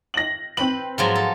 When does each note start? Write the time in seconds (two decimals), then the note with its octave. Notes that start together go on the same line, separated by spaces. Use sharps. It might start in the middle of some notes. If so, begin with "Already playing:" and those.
0.14 A#6 F#7
0.57 C4 B4 F#7
0.98 G#2 F3 F#3
1.15 A4